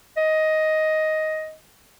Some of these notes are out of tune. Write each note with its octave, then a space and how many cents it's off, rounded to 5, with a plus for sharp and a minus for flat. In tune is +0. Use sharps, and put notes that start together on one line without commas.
D#5 +10